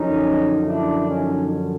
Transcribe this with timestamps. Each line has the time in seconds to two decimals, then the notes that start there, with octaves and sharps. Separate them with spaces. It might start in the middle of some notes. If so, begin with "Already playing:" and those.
Already playing: F#2 D3 F3 C#4 D#4
0.65 D4 E4
1.06 C#4 D#4